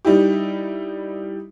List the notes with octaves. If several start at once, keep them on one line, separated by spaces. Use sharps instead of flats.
G3 D#4 E4 G4